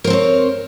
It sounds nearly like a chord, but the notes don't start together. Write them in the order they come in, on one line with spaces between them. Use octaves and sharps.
A#4 C5 C4 C#5